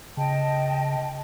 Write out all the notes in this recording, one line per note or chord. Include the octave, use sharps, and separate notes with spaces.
C#3 D#5 G5 A5